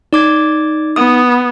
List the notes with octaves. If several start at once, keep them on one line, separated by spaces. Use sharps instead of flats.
D#4 D5 D6 G#6
B3 D#6